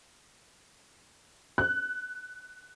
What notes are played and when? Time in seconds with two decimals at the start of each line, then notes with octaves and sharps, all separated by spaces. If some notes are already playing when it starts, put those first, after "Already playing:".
1.58 F#6